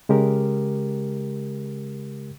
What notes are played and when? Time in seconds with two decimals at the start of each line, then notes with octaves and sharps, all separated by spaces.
0.09 C#3 G#3 G4 A#4